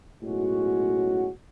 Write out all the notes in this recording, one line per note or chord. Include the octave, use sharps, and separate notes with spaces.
B1 A2 G#3 C#4 F#4